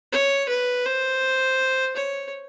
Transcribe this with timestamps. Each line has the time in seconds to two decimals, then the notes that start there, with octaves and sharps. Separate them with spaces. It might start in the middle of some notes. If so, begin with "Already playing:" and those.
0.12 C#5
0.49 B4
0.86 C5
1.96 C#5